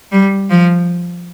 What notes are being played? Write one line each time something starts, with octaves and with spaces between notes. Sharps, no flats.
G3
F3